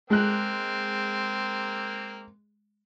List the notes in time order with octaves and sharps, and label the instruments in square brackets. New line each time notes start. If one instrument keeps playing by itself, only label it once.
[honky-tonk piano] G#3 F#6 [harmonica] A#3 C4